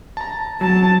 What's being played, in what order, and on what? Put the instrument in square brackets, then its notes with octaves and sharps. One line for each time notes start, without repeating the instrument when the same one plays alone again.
[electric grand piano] A5 A#5
[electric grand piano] F#3 [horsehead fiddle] A5